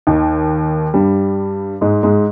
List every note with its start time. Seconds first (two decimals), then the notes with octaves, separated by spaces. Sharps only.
0.07 D#2 D#3
0.94 G2 G3
1.81 G#2 G#3
2.03 G#2 G#3